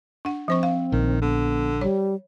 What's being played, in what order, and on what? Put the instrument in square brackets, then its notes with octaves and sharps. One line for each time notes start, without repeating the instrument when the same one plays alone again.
[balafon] D4 F#5
[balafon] F3 C5 C#6 [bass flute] C4
[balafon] F5
[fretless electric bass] A#1 [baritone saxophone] D#3
[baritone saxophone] D3 [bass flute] B3
[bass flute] G3 [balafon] C#5